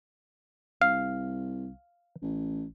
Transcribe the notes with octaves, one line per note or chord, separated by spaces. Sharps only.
C2 F5
A1